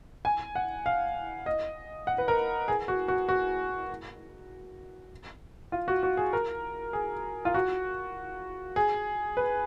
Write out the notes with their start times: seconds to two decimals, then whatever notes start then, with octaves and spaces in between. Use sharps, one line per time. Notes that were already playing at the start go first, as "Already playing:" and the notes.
0.25 G#5
0.55 F#5
0.86 F5
1.46 D#5
2.07 F#5
2.18 B4
2.28 A#4
2.68 G#4
2.88 F#4
3.08 F#4
3.29 F#4
5.72 F4
5.88 F#4
6.03 F#4
6.17 G#4
6.33 A#4
6.93 G#4
7.45 F4
7.54 F#4
8.76 G#4
9.37 B4